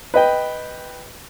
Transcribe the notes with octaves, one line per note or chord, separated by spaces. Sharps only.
B4 D#5 G5